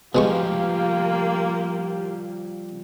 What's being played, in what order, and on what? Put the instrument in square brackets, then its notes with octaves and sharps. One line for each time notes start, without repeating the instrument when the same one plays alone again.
[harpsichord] B2 G#3 C#6 [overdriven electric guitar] F3 G3 [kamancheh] A#3 F4 [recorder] G4